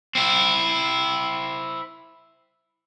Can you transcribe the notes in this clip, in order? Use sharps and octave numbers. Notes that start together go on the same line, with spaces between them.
C4 E4